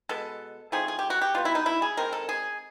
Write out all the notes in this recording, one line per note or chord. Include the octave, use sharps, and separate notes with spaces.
B2 G#3 B3 A4
F3 A3 C4 D#4 G#4
G#4
G4
F#4
G4
B2 G3 B3 F4
E4
D#4
E4
G#4
D#3 G#3 C4 D#4 A#4
A4
G#4